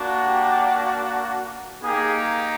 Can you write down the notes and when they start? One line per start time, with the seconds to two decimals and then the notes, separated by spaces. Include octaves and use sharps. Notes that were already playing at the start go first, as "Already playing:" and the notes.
Already playing: A#3 D4 F#4
0.26 G4
1.82 A#3 D#4 G4 G#4